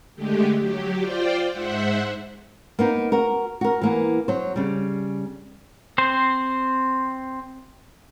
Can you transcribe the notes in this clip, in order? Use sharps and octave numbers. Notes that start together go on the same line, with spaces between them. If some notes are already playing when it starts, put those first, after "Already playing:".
D3 G#3 A3 G4
F#3 G4
F4 C5 D5 G5
G#2 C5 E5 F#5
A#3 B3 D#4
F#4 A#4
F#4 A#4
E3 A#3 B3
F#3 C5
C#3 G3
C4 C5